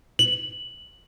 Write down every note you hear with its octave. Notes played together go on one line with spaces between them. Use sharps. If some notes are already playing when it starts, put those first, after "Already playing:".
F#7